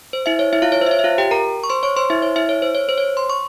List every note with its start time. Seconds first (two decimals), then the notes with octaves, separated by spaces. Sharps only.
0.13 C5
0.26 E4 E5
0.39 C#5
0.53 E4 E5
0.62 F4 F5
0.72 C#5
0.81 C5
0.86 E5
0.91 C#5
0.99 E5
1.04 F4 F5
1.18 G4 G5
1.31 A#4 A#5
1.64 C#6
1.70 C5 C6
1.83 C#5 C#6
1.97 C5 C6
2.10 E4 E5
2.22 C#5
2.36 E4 E5
2.49 C#5
2.62 C5
2.75 C#5
2.89 C5
2.98 C#5
3.17 C6
3.30 C#6